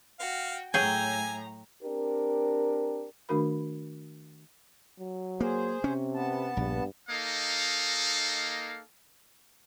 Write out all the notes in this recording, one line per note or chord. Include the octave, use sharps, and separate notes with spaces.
F#4 F5 G5
A2 F#3 G#4 G5 G#5 A#5
C4 D4 G4 A#4
D#3 A3 D4 F#4 A#4 B5
F#3
A#3 G#4 C5
C3 C#4
B3 A5
A#1 G2
A#3 D#4 A4 D#5 F5